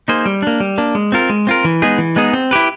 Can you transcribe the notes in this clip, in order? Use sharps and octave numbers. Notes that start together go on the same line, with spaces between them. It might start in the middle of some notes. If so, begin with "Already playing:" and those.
A#3 D#4 G#4 C5
G3
A#3 D4
G3
A#3 D4
G#3
C4 F4 A#4
G#3
C4 F4 A#4
E3
G#3 B3 D#4 G#4
E3
G#3 B3 D#4 G#4
C4
E4 G4 B4